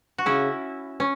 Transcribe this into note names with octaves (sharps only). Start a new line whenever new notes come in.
F#4
C#3 C#4 E4
C#4